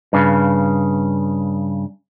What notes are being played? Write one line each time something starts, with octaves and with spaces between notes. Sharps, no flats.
G2 C#3